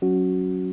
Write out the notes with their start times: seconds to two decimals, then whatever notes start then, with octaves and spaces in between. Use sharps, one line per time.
0.02 F#3 C#4 F#4